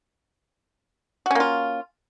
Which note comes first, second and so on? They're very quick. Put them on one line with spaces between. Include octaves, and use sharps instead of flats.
F#4 C#4 A#3 F4